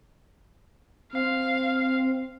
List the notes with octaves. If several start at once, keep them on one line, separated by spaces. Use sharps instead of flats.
C4 F5